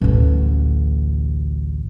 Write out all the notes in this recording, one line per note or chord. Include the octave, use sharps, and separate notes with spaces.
A1 D2